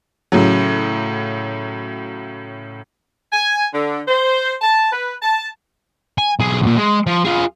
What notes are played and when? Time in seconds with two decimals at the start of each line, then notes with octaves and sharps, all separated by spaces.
0.32 A2 C#3 F#3
3.33 G#5
3.73 D3
4.08 C5
4.61 A5
4.92 B4
5.22 A5
6.18 G#5
6.40 B1 G#4
6.62 B1 A#2
6.77 G#3
7.07 F3
7.25 F4 G#4